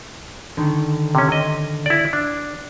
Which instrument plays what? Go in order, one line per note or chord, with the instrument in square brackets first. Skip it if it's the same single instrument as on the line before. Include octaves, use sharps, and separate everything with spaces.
[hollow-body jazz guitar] D3 D#3
[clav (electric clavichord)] C3 C#4
D#5
E4 D5
D4